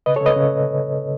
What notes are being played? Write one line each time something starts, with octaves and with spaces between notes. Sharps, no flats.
C#3 B4 D#5
A4 C#5
C#3 B4 D#5
C#3